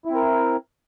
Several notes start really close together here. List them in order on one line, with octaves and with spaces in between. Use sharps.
E4 C4 A#4